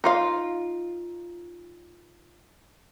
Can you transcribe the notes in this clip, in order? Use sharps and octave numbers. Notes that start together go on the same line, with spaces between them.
D#4 F4 F5